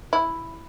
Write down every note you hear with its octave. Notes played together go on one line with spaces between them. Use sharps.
E4